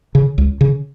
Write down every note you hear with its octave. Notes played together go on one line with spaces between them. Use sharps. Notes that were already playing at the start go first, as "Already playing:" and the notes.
C#3
C#2
C#3